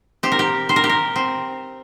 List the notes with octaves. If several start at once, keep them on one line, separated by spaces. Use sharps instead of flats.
C4 G4
A#4
G4
C4 C5
A#4
G4
A#4
C4